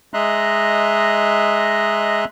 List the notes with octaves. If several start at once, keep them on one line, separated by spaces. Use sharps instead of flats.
G#3 D#5 E5 A#5 C6 F#6